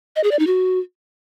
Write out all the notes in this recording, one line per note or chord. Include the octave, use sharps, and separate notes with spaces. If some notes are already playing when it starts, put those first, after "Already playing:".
D#5
G#4
D5
D#4
F#4